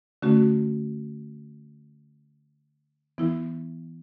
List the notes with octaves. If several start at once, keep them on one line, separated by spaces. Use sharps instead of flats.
D3 A3 C#4 F#4
E3 B3 E4